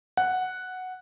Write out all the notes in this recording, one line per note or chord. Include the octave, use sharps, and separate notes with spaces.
F#5